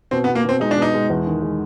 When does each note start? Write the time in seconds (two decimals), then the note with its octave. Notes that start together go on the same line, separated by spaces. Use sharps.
0.11 B2 C4
0.24 B3
0.28 B2
0.35 A#3
0.45 B2 C4
0.60 G#3 D#4
0.71 D4
0.76 B2
0.82 D#4
0.94 G#3
1.10 E2
1.27 D#3
1.42 G#3